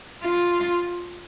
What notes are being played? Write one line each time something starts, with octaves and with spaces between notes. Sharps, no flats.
F4